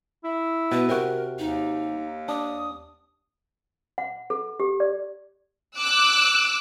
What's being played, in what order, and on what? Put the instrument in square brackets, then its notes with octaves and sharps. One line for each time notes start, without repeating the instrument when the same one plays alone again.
[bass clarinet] E4
[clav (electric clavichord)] B2 [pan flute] B4
[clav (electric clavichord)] C3 F#4 [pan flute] A#4
[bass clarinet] D#2 [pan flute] D#4
[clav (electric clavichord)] D4 [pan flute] D#6
[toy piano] F#5
A4
G4
D5
[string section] D6 E6 F#6